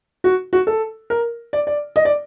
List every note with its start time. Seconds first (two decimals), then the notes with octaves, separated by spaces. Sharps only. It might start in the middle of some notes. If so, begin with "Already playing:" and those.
0.24 F#4
0.53 F#4
0.67 A4
1.10 A#4
1.53 D5
1.67 D5
1.96 D#5
2.05 D5